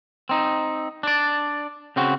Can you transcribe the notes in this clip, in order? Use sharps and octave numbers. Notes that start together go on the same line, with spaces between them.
C4 D#4
D4 D5
C#3 C4 F#4